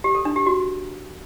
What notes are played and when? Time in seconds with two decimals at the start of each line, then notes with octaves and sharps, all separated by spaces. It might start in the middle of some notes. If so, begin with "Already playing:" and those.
0.04 G4
0.15 A4
0.25 D4
0.36 G4
0.46 F#4